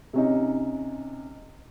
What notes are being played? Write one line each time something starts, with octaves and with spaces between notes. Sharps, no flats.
C3 C#4 D#4